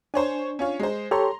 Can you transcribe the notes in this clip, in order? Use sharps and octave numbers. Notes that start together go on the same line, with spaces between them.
D4 C5 C#5 G#5
C#4 F4 C#5
G#3 C5
G4 A4 C#5 A#5 C6